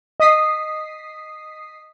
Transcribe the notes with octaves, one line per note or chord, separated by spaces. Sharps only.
D#5 D#6 B6 C7